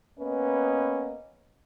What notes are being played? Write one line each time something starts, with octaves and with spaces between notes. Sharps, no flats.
A#3 B3 C#4 B4 D#5